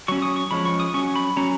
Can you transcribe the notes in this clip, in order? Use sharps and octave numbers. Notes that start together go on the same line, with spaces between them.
F#3 C#4 C#6
D#6
C#6
F3 G#3 C#4 B5
C#6
D#6
F#3 C#4 C#6
B5
F#3 C#4 A#5